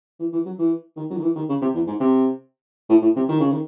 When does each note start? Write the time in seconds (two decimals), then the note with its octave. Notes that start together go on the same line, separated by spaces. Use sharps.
0.19 E3
0.33 E3
0.45 F#3
0.58 E3
0.97 D#3
1.10 F#3
1.16 D#3
1.23 E3
1.36 D#3
1.49 C#3
1.61 C3
1.74 E2
1.87 G#2
2.00 C3
2.89 A2
3.02 A2
3.16 C3
3.29 D#3
3.40 C#3
3.52 D#3